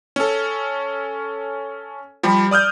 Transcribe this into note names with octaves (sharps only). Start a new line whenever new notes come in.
C#4 A4
F3 G3 B5
D5 D#6 F6 G6